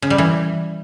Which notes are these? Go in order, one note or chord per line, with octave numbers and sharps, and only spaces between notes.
C#3
G3
E3